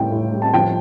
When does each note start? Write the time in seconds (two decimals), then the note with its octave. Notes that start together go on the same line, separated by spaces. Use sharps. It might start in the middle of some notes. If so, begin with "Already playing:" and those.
Already playing: A2 G3 G5
0.11 A2
0.32 G3
0.42 A5
0.54 F3 G5